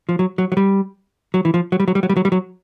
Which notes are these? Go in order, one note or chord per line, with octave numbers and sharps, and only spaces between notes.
F3
F#3
F#3
F#3
G3
F#3
E3
F3
F#3
G3
F#3
G3
F#3
G3
F#3
G3
F#3